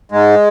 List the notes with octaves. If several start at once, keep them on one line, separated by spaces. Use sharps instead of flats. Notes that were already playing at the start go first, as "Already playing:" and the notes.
G#2 G#3